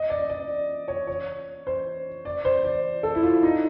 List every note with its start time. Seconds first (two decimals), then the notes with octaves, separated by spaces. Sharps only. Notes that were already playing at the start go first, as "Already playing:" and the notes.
Already playing: D#5
0.10 D5
0.30 D5
0.88 C#5
1.07 C#5
1.67 C5
2.25 D5
2.45 C5
2.64 D5
3.03 A4
3.15 E4
3.23 F4
3.43 D#4